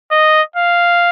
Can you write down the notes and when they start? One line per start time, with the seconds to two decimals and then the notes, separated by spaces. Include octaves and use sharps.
0.11 D#5
0.56 F5